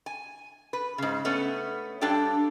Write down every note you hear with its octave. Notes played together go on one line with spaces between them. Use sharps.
G#5
B4
G#2 C#3
A3 B3 C#4
G2 D4 G4 A4 G5